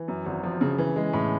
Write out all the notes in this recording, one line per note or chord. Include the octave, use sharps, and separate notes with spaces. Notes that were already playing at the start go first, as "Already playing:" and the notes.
Already playing: E3
F#2
G#1
F3
C#3
E3
G#3
A2